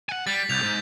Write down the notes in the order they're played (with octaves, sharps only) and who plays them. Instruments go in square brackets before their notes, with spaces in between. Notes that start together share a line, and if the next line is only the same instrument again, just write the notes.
[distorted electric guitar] F#5 G#5
[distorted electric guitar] G3 [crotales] A6 B6
[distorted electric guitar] C2 [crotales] G6 F7
[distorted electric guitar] G#2